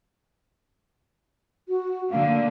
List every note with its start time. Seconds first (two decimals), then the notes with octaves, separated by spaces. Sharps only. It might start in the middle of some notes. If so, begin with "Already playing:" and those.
1.69 F#4
2.11 D3 A#3 F5